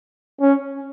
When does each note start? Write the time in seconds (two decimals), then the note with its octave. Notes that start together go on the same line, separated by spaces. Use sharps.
0.41 C#4